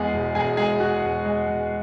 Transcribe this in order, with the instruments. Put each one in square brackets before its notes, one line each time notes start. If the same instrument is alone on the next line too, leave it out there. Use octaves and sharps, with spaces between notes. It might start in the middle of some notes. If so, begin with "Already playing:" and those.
Already playing: [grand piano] E2 G#3 G#4
E1
E1 G#4 G#5
G#3 G#4 G#5
E1 F#4 F#5
E1
G#3
E1